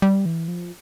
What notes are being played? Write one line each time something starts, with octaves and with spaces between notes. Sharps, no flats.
G3
E3
F3